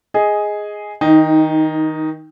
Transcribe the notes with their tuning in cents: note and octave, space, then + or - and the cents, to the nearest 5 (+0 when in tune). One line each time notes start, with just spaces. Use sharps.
G#4 +0 D#5 +10
D#3 +25 D#4 +0